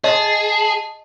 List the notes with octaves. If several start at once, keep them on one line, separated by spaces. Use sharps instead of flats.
G#4 D#5 A5